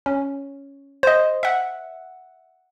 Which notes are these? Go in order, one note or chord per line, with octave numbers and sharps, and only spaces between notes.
C#4
C5 D#5
E5 F#5